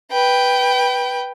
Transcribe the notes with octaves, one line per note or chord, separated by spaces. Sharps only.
B4 G5